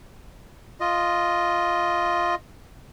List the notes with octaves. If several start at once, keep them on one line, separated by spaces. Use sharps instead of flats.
F4 D#5